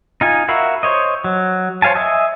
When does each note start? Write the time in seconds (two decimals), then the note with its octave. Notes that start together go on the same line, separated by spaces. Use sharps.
0.21 D#4 F4 G#5
0.48 F#4 A#4 E5 F5 B5
0.83 C5 C#5 D#5
1.24 F#3
1.82 C5 C#5 F5 G#5 A5
1.95 D#5 E5 G#5